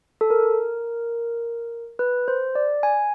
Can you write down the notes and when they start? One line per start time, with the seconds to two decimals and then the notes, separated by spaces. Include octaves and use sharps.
0.21 A4
0.30 A#4
1.99 B4
2.28 C5
2.55 D5
2.83 G#5